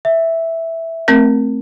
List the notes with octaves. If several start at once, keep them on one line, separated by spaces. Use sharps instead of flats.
E5
A3 C4 A#4